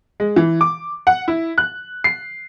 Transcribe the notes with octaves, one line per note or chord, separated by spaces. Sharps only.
G#3
E3
D6
F#5
E4
F#6
C7